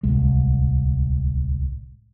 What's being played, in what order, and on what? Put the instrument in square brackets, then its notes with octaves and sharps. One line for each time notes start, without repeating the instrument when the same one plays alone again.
[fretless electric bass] D1 C2 G#3